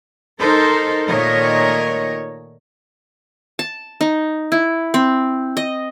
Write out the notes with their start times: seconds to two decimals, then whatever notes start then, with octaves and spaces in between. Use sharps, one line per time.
0.39 D#4 A4 A#4 C5
1.08 A#2 D#3 A3 A#4 C#5 D#5
3.59 A5
4.01 D#4
4.52 E4
4.94 C4
5.57 D#5